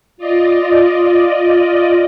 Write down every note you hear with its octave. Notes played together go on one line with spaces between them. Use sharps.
F4 D5 D#5